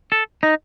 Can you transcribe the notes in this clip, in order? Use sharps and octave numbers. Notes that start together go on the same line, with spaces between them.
A4
D#4